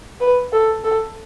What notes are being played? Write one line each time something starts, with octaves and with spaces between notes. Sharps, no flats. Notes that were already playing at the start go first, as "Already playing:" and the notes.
B4
A4
A4